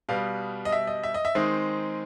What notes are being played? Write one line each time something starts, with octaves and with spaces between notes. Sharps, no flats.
B2 G3 B3 F5
D#5
E5
D#5
E5
D#5
E5
D#3 G#3 C4 D#4